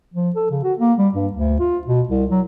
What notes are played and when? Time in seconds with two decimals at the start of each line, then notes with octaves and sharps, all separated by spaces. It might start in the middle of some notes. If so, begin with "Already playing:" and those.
0.14 F3
0.36 A4
0.51 C#3
0.64 F#4
0.79 A#3
0.98 G3
1.14 G2
1.33 D2
1.59 F4
1.87 B2
2.09 C2
2.31 F#3